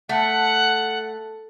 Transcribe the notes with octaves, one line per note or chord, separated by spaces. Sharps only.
A3 F#5